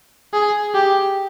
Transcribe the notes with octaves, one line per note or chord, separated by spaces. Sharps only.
G#4
G4